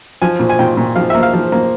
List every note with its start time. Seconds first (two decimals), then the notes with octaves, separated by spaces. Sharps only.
0.22 F3 G#5
0.40 A#2
0.49 G#5
0.59 A#2 G5
0.77 A#2
0.96 F3 F5
1.10 A#3 E5
1.23 F5
1.34 F3
1.52 A#3